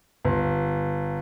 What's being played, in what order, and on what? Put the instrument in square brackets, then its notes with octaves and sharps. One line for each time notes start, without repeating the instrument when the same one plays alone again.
[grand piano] G1